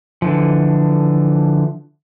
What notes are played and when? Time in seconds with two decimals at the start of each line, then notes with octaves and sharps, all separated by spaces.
0.22 D3 E3 F3